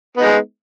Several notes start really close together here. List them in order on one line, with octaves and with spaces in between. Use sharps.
B3 D#4 G#3